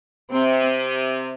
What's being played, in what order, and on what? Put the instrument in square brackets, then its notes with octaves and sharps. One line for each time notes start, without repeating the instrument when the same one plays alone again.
[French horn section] C3 [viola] C4